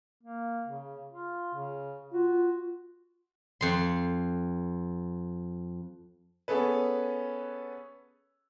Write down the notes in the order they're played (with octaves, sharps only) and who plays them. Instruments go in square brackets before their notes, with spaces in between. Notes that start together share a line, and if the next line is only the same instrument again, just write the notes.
[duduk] A#3
C#3
F4
C#3
[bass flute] F4 [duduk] F#4
[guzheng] F2 C6
[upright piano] B3 C#4 G#4 A4 B4